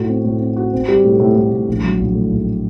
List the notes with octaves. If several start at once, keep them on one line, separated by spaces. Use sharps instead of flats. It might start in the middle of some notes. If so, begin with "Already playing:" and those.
Already playing: A2 F#4
C4
A2
C4
F#4
C4
G3
A2
A2
A2
A2
A#1
F#3
A#1
A2
A#1